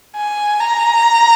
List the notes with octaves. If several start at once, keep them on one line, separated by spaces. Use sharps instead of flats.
G#5
A#5